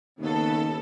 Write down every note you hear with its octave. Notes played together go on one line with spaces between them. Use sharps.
D#2 C#3 B3 A4